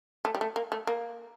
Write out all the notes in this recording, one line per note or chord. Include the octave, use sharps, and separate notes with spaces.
A3
G3
A3
A#3
A3
A#3